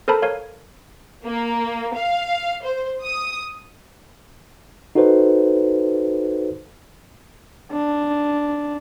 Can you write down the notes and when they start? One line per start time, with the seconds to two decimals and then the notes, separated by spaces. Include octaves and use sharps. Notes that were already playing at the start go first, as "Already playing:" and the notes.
0.08 A4 A#4 C5 A5 B5
0.22 A#4 C#5 F5
1.26 A#3
1.95 F5
2.64 C5
3.02 D#6
4.95 D#4 F#4 A4 B4 C5
7.72 D4